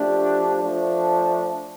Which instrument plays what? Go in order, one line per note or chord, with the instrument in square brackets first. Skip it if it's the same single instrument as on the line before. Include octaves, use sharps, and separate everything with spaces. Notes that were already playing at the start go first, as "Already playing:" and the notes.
Already playing: [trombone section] F3 A3 D4 G4
F3 A3 D4